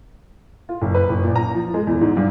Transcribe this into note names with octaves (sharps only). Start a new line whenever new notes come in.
F4
F#1
B4
F#1
A#2
A#5
F3
G#3
E2
G#2
G2